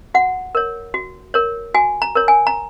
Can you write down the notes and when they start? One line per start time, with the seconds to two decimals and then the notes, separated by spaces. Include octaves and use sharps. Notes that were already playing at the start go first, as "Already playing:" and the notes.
0.14 F#4 F#5
0.55 A#4 C#5
0.94 F#4
1.34 A#4 C#5
1.74 F#4 G#5
2.02 A#5
2.15 A#4 C#5
2.28 G#5
2.47 A#5